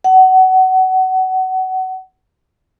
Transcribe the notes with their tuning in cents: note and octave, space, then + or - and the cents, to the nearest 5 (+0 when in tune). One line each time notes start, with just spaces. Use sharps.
F#5 +25